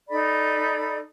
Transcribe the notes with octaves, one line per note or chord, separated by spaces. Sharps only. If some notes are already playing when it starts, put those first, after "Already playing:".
D#4 A4 D5 B5